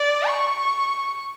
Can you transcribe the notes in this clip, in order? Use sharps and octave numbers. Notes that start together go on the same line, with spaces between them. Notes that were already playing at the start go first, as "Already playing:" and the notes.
Already playing: D5
C#6